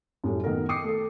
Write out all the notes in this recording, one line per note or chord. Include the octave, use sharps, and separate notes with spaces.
F#2 A2 G3 A3
D#3 A3 B3 A#4
G5 D6 D#6 C7 C#7
A3 A4